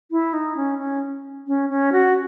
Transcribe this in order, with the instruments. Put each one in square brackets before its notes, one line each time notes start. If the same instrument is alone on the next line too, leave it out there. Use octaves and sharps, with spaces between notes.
[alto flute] E4
D#4
C#4
C#4
C#4
C#4
F#4